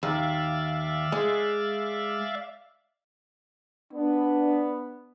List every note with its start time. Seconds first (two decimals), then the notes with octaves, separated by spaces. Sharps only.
0.03 D#2 D5 E5 F5
1.12 G#3
3.93 B3 D4